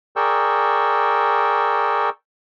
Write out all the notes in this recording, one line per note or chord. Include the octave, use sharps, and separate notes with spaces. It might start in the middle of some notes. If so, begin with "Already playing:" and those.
G#4 A#4 D5 G5 C#6 E6